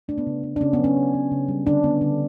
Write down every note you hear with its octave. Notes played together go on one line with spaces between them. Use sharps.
A3 D4
B3
C#3
B3
D4
C#3 C#4
B3
F#3
C#4
C#3
B3
C#3
G3
D3 D4
B3
D3